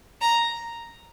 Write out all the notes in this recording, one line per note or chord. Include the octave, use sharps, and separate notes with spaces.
A#5